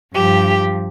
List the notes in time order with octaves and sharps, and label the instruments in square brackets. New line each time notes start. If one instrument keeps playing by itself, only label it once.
[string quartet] G2 F3 G4